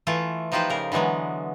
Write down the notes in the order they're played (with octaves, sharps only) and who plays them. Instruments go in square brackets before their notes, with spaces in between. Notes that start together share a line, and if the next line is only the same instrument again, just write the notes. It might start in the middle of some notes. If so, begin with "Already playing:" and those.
[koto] E3 A3 F4
F3 D#4 F4 G4 B4 C5
C#3 A#4
D3 E3 F#3 G#3 B3